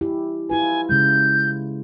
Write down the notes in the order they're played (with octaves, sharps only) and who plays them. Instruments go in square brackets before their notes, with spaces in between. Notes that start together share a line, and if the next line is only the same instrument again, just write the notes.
[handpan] E4 G4
[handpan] E4 F4 B4 [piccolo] G#5
[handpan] C#3 G#3 [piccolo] G6